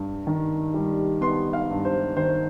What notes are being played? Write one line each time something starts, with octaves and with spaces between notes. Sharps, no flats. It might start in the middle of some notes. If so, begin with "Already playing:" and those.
Already playing: G2
D#3
G3
B3 C6
F5
G2
C5
D#3 C5